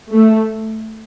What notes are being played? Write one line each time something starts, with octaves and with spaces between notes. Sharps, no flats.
A3